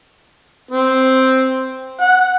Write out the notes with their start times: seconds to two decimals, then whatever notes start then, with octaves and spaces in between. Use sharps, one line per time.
0.71 C4
2.01 F#5